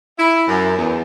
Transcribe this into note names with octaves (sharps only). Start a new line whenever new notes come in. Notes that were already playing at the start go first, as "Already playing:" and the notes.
E4
F#2
E2